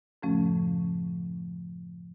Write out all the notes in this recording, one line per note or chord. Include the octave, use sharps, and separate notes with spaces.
F#2 A2 C#3 F3 A3 C#4